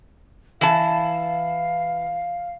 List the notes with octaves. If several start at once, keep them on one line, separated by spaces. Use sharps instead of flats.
E3 F5 A5